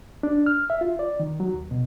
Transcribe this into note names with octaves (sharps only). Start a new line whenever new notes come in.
D4
F6
E5
F4
D5
D#3
F#3
D#2
B2